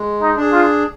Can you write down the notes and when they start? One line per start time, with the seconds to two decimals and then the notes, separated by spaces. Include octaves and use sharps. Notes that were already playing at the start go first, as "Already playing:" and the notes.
Already playing: G#3
0.21 D#4
0.37 D4 G#4
0.52 F4